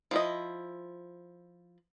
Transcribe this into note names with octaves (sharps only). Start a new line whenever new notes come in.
F3 E4 D#5